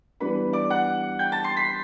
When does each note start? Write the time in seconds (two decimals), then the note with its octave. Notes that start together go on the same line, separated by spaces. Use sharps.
0.20 E3 G3 B3 D4 B4 B5
0.53 D5 D6
0.70 F#5 F#6
1.19 G5 G6
1.32 A5 A6
1.44 C6 C7
1.57 B5 B6